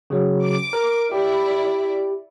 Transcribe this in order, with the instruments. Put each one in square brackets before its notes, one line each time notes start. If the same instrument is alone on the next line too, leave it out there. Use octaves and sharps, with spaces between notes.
[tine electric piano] C#3 F#3
[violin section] D6
[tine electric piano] A#4
[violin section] E4 D5 [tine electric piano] G4